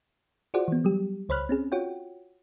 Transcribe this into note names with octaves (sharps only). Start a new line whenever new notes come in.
F4 F#4 G#4 C5 D5 F#5
E3 B3
F#3 G3 G4
C#2 C5 C#5 B5 F6 F#6
C4 C#4 G#4
F4 F#4 C#5 F#5 G5